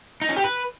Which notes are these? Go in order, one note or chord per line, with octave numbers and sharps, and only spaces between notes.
D#4
C#4
G4
B4